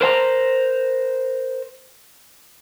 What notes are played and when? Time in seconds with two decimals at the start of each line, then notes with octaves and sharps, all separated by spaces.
0.01 A#4 C5 G5 A#5